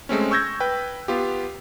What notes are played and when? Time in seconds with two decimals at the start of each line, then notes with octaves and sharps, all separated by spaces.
0.09 G#3 A3 C4 C#4
0.31 C#6 E6 G6 G#6 A#6
0.60 B4 G5
1.08 B3 F4 G4